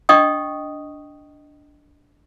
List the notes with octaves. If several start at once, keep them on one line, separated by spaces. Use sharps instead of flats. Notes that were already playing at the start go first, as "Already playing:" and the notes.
D4 D#5 G5 C#6 D#6